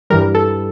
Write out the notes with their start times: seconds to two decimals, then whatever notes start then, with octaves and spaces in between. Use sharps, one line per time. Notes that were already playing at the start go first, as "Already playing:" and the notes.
0.10 G2 E3 G3 A#4
0.35 A4